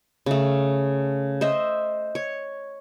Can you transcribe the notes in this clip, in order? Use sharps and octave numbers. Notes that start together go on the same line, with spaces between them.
C#3 A3
C5 D#5 E5
C#5